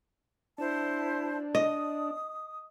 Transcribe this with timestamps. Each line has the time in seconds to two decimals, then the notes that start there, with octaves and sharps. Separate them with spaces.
0.58 D4 E4 C5 A5
1.55 D#5 D#6